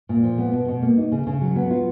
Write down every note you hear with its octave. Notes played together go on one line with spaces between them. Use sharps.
A#2
F3
B3
B2
B2
A#3
D#4
C#3
C#3
F#3
B3
F4